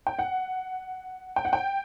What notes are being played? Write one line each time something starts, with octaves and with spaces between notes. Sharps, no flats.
G5
F#5
G5
F#5
G5